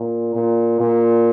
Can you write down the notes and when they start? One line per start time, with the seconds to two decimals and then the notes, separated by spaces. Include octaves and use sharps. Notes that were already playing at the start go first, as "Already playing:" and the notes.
Already playing: A#2
0.35 A#2
0.80 A#2